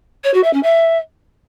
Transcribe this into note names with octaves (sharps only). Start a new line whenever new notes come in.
C#5
F#4
E5
C#4
E5